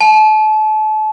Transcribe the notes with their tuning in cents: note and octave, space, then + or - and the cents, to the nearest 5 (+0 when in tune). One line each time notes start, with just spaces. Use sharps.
A5 -35